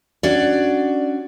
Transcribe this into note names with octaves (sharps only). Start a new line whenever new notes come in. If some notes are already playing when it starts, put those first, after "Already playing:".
C#4 D4 F#4 D5